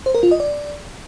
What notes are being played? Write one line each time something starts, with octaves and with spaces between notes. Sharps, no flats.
C5
A#4
F4
D#5
D5